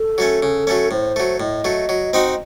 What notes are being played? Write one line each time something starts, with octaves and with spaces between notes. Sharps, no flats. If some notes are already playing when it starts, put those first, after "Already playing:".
Already playing: A4
F#3 A3 C#4
C#3
F#3 A3 C#4
A2 C5
F#3 A3
A2 D#5
F#3 A3
F#3
C4 D#4 F#4